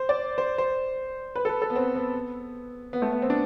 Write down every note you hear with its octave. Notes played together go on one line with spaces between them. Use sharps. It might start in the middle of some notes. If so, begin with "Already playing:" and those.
Already playing: C5
D5
C5
C5
B4
A4
B4
A4
B3
C4
B3
B3
A3
B3
C4
D4